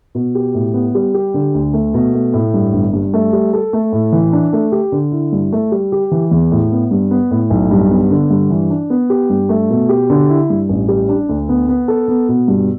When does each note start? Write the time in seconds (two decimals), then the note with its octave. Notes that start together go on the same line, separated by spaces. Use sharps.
0.15 B2
0.35 G4
0.55 A2
0.74 B3
0.95 G3
1.14 G4
1.34 D3
1.54 D2
1.73 A3
1.94 B2
2.14 A3
2.34 A2
2.54 G2
2.73 G1
2.93 G2
3.14 A3
3.33 G3
3.53 A4
3.73 A3
3.93 A2
4.12 E3
4.33 D4
4.53 A3
4.72 G4
4.92 D3
5.12 E4
5.32 G2
5.52 A3
5.72 G3
5.92 G4
6.11 E3
6.31 E2
6.52 A2
6.71 B3
6.91 G2
7.11 B3
7.31 A2
7.50 B1
7.71 G2
7.91 B3
8.11 D3
8.30 G2
8.50 E3
8.70 D4
8.90 B3
9.10 G4
9.30 G2
9.49 A3
9.70 B2
9.89 G4
10.10 D3
10.29 E4
10.50 G2
10.69 A1
10.88 G3
11.09 D4
11.29 D2
11.49 B3
11.69 B3
11.88 A4
12.08 B3
12.29 B2
12.48 G2